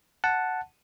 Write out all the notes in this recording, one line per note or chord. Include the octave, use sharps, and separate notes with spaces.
F#5 A5